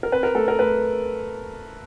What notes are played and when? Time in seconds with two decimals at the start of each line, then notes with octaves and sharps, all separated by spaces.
0.03 A#4
0.12 C4 B4
0.23 A#4
0.35 A3 A4
0.48 A#4
0.59 A3 B4